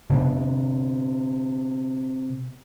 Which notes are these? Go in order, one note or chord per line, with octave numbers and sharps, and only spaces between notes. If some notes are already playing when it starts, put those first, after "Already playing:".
C3 B3 D4